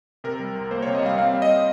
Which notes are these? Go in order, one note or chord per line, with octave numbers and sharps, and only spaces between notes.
C3 A#4
G3
C2
A#3 C5
C3 C#5
D#5
G3 F5
C4 F5
G3
D#5